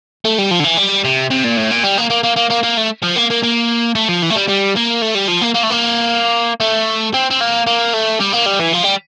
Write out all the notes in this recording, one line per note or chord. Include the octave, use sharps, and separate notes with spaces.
A3
G3
F3
D3
E3
G3
C3
C3
A#2
A2
A#2
G3
A#3
A#3
A#3
A#3
A#3
A#3
A3
F3
A#3
A#3
A#3
A3
F3
E3
A3
G3
G3
A#3
A3
G3
F3
A#3
A#3
A3
A#3
A3
C4
C4
A#3
A#3
A3
G3
A#3
G3
E3
F3
G3